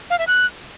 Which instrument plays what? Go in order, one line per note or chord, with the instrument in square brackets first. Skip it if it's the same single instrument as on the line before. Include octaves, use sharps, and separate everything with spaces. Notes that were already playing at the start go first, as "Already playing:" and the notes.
[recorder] F5
E5
F#6